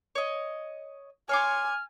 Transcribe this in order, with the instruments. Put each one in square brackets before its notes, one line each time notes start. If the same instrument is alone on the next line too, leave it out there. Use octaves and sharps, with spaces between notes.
[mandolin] C#5 D#5
[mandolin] C#5 C6 D6 [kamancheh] G#5 [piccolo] F6